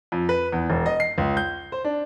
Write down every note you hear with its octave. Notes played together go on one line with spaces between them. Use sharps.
F2
B4
E2
E1
D#5
C7
C#2
G6
C5
D4